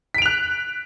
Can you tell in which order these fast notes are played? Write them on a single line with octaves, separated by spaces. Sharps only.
B6 D7 F7 F#6